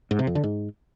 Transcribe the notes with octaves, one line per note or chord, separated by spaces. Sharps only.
G#2
C3
F2
D3
G#2